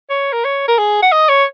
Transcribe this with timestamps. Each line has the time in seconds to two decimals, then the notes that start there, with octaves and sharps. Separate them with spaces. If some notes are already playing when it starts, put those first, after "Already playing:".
0.10 C#5
0.33 A#4
0.44 C#5
0.68 A#4
0.78 G#4
1.02 F#5
1.12 D#5
1.29 C#5